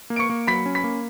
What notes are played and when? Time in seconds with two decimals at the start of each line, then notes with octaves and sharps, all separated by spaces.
0.10 A#3
0.16 D7
0.19 C#6 C#7
0.30 A#3
0.47 F#3 B5 B6
0.66 C#4
0.75 B5 B6
0.84 A#3